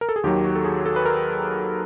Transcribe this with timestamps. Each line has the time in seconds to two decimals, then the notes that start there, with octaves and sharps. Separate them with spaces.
0.01 A#4
0.09 A4
0.16 G#4
0.24 D#2 D#3 F#3 G4
0.44 F#4
0.55 A4
0.65 G#4
0.86 A4
0.96 B4
1.05 A#4